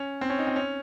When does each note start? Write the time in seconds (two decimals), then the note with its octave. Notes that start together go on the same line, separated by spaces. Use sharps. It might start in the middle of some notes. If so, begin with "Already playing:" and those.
Already playing: C#4
0.21 C4
0.30 C#4
0.39 D#4
0.47 C4
0.56 C#4